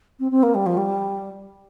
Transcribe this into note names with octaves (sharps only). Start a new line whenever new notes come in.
C4
C4
A#3
G3
F3
G3